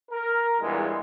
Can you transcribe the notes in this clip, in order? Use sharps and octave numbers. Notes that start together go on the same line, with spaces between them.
A#4
E2 G2 A#2 G#3